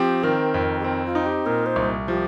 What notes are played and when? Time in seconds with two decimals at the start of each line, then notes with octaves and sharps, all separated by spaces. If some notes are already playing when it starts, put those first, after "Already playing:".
Already playing: F3 C4 G4
0.23 D#3 A#4
0.54 F2
0.79 G4
0.84 C4 A#4
1.05 F4
1.15 D#4
1.26 G4
1.46 A#2 A#4
1.66 C5
1.76 C2
2.08 F3 G4